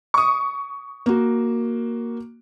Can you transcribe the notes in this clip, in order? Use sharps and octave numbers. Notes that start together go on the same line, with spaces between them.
C#6 D#6
A#3 F#4